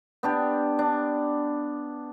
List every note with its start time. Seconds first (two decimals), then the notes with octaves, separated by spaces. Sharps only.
0.23 B3 D4 G4
0.79 D4